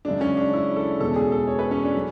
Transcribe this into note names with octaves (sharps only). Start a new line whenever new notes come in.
F#2 C#3 G#3 D4
C#4
D4
E4
A4
E2 B2 G#3 A4
G#4
A4
C#5
B4
C#4
D4
F#3